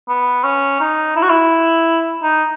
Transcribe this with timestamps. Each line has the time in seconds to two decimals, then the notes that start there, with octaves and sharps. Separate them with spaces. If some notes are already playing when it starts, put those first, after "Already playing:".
0.08 B3
0.44 C#4
0.80 D#4
1.16 E4
1.22 F#4
1.29 E4
2.23 D#4